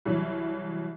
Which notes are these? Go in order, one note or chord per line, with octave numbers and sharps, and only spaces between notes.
C2 E3 F#3